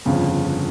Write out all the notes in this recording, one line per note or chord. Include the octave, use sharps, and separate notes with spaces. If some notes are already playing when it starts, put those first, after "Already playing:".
G1 F2 C#3 F3